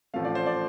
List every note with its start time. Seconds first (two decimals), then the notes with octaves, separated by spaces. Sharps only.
0.14 A1 A2 F3 A3 F5
0.25 D5
0.35 C5
0.46 D5